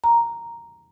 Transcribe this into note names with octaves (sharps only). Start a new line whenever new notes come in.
A#5